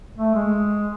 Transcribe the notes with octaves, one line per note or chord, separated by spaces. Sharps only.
A3
G#3